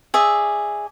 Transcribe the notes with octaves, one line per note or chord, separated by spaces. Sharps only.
G#4 D5 E5